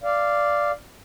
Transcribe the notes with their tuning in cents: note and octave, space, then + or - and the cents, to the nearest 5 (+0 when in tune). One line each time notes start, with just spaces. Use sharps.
D5 +0 F5 -10